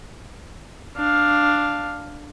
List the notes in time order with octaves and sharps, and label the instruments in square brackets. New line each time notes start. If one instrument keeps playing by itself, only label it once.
[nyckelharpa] D4 F5